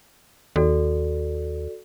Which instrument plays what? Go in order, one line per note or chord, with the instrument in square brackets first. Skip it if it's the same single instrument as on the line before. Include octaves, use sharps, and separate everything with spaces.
[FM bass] D#2 [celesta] F#4 A4 D5